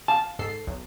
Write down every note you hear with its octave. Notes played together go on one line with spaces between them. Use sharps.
F5 A5
G#2 A4 C7
B1